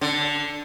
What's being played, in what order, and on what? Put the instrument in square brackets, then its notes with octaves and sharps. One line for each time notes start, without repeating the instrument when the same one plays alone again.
[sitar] D3